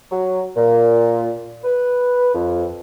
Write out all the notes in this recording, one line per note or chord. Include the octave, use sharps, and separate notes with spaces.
F#3
A#2
B4
F2